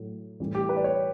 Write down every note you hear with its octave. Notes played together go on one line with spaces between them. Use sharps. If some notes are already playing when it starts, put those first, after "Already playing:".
Already playing: A2 F#3
A2 E3 G3
G4
B4
D5
C#5